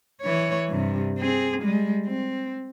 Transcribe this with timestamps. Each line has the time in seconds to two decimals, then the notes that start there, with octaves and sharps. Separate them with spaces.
0.22 E3 C#5
0.68 G2 C3
1.18 C4 G#4
1.62 G3 G#3
2.06 C4